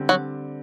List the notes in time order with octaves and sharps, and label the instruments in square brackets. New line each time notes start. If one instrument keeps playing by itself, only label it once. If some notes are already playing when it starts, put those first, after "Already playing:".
Already playing: [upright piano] D3 G3 C4
[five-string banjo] F#3